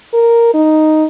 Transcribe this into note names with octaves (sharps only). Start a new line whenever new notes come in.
A#4
D#4